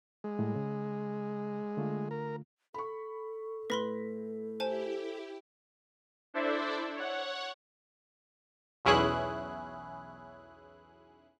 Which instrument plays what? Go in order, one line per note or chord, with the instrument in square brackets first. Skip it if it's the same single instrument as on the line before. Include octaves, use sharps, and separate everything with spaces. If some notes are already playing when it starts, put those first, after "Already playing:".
[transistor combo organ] G#3
[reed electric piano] A2 G3
C#3
D3 A3 F4
[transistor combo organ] A#4
[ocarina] A4 [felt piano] B5 C#6
[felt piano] A2 A#6 B6 [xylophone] B4 B5 C6
[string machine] E4 G4 [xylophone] C5 G#5 A5
[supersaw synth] D4 E4 A4 C5 D5 E5
C#5 F#5
[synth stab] B1 E2 C#4 E4 G#4 F#6